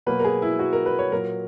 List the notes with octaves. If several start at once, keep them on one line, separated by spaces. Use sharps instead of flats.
B2 F#3 A#3 B4
A#4
G#4
E4
F#4
A#4
B4
C#5
A#2 F#3 A#3 A#4